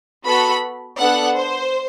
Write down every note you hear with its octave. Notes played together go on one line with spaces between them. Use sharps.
B3 F#4 A4 B5
B3 D4 A4 F#5
C5